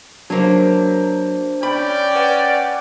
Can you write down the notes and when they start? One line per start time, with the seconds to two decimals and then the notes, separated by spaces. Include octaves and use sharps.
0.30 F#3 A#3 D4 C5
1.63 C#4 D5 G5 B5
2.16 B4 F#5 G#5